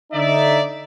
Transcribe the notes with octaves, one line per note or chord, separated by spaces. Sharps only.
D3 D#4 D5 E5